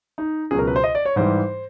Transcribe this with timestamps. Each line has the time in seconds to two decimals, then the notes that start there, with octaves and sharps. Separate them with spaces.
0.18 D#4
0.51 C#2 B2 F#3 G#4
0.59 A#4
0.67 B4
0.76 C5
0.84 D#5
0.95 D5
1.05 C#5
1.16 G#2 E3 G3 C5